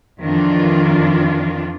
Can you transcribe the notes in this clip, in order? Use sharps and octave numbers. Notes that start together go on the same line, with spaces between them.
F2 D#3 E3 D4 F4